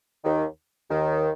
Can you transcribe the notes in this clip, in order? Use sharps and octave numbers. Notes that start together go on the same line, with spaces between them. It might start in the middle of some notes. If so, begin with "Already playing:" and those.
D#2 D#3
D#2 D#3